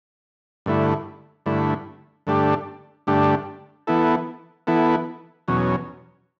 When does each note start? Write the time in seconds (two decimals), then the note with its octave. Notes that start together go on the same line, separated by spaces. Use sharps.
0.66 G2 D3 A3 E4
1.46 G2 D3 A3 E4
2.27 G2 D3 A3 D4 G4
3.07 G2 D3 A3 D4 G4
3.87 E3 B3 E4 A4
4.67 E3 B3 E4 A4
5.48 E2 B2 F#3 C#4